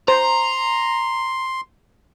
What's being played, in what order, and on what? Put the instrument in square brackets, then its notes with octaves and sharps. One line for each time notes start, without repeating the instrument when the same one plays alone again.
[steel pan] C5 [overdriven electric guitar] A#5 [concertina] C6